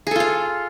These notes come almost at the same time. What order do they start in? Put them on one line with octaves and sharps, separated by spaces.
G#4 A4 F4 F5